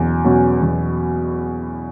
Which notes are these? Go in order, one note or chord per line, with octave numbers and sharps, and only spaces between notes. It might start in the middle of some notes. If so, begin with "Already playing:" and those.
Already playing: E2 B2 F#3 C#4
B2 F#3 C#4
E2